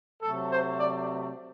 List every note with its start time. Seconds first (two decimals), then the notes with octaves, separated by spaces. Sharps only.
0.22 C3 F#3 A3 A4
0.50 C5
0.78 D5